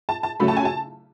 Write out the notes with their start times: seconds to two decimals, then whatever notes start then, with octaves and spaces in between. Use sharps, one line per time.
0.09 A5
0.23 A5
0.40 C#3 F#3 A3 B5
0.48 A5
0.57 G#5
0.65 A5